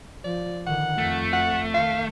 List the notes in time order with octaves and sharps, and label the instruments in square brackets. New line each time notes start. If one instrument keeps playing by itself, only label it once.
[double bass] F3 [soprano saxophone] D5
[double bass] D3 D#3 [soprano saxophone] F#5
[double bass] F2 [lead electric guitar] A3
[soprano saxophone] F#5
[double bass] D#3 [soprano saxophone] F5